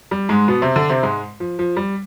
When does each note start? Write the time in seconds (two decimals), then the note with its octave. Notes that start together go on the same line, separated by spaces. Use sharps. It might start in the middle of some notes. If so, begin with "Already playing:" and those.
0.11 G3
0.29 G#2 G#3
0.48 B2 B3
0.62 C3 C4
0.76 D3 D4
0.89 C3 C4
1.03 G#2 G#3
1.40 F3
1.59 F3
1.77 G3